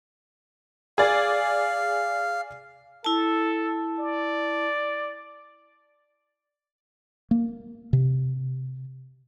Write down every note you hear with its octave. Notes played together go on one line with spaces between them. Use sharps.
G#4 D5 F5
E4 A4 A5
D5
A#3
C3